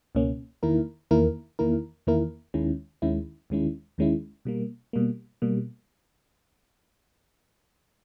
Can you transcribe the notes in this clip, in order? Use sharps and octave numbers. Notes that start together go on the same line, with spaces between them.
C#2 B2 A#3 C#4
E2 D#3 A#3 E4 A#4
E2 D#3 A#3 E4 A#4
E2 D#3 A#3 E4 A#4
E2 D#3 A#3 E4 A#4
D#2 D#3 G#3 C#4 E4
D#2 D#3 G#3 C#4 E4
D#2 D#3 G#3 C#4 E4
D#2 D#3 G#3 C#4 E4
B2 G3 A#3
B2 G3 A#3
B2 G3 A#3